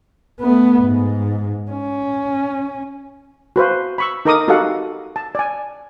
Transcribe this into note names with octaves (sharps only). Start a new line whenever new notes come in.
A3 B3
G#2
C#4
F#4 B4 C5 F5
B5 C#6 E6
D#4 A4 A#4 A#5 D6 D#6
D#4 F#4 G4 A4 F5 F#5
A5
D5 G#5